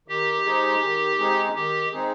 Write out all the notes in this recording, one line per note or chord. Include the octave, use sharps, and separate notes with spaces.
D#3 G4
G#3 C4 D#4 G#4
D#3
G#3 C4 D#4 G#4
D#3 G4
G#3 C4 D#4 G#4